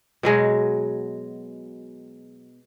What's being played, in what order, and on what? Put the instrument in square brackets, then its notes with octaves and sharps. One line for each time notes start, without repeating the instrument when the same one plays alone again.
[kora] B2 F#3 G#3